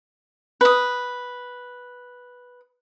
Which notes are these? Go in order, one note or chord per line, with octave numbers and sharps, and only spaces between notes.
B4 D#6